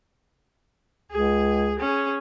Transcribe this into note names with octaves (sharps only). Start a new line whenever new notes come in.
C#2 G#4
C#4 G#4